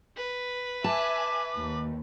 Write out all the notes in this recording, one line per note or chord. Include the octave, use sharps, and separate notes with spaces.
B4
E5 G#5 A5 D6
D#2